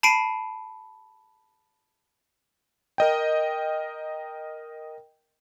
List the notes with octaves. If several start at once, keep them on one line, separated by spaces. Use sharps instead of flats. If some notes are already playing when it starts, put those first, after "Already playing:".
A5 B5 C7 D7 D#7
A#4 D#5 G5